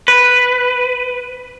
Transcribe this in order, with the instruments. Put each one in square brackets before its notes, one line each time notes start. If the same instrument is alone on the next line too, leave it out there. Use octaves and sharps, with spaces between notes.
[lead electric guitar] B4